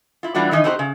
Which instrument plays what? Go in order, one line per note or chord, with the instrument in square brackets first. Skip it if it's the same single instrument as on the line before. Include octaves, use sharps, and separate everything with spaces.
[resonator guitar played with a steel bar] E4 F4
E3 G3 D4 F4 F#4
D#3 E3 D#4
C4 D#4 F#4 G4 A#4 C5
C#3